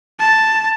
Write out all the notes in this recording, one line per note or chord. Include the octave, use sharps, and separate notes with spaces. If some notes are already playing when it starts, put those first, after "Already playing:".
A5